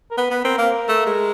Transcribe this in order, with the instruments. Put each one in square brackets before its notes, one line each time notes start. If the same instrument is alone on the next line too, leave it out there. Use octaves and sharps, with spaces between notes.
[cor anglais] A#4
[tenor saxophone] B3 [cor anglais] B4
[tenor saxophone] B3
[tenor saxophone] C4 [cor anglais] A#4
[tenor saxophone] A#3
[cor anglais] A#4
[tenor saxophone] A3
G#3